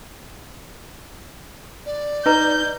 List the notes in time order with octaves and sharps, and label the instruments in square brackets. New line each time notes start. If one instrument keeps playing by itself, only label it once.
[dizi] D5
[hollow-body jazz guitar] D#4 [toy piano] B4 A#5 [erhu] G6